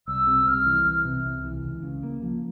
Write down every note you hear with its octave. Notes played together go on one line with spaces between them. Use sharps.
C2 E6
C3
C2 F6
E3
C2
C3
C2
E3
C#2
C#3
A#3
F3